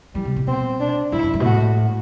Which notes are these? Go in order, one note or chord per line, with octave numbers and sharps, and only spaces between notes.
E3 G3
C3
B2
B2 C4
D4
G2 E4
F#2
G2
B2
A2 F#4